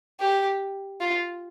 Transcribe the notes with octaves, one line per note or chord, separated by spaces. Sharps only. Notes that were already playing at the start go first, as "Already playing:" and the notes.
G4
F4